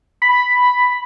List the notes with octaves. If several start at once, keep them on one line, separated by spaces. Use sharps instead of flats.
B5